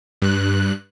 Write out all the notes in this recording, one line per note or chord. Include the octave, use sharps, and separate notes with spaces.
G2 F#6